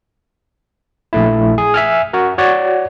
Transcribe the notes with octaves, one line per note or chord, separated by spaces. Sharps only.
A#1 A3 E4
G#4
E5 G#5 F6
F#4 A#4
F#4 C#5 D5 F#5